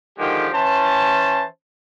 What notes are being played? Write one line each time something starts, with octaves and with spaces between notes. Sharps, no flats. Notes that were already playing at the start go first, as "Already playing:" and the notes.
D3 D#3 F3 G#3 G4
E3 C#4 C5 A5